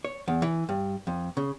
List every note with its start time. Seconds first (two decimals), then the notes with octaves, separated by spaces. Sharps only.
0.05 C#5
0.28 E2
0.42 E3
0.69 G2
1.07 F2
1.37 C#3